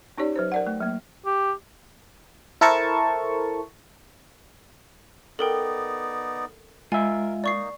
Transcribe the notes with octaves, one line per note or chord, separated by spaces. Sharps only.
C#4 D#4 G4 C#5 D5
F#3 B4 C5
A#4 D5 F#5
A3
F#3 A#3
G4
E4 A4 A#4 C5 A5 C#6
B3 D#4 A4 A#4 D5 G5
G#3 F4 A#4 E5 G#5
A#3 D#4 D5 C#6 C7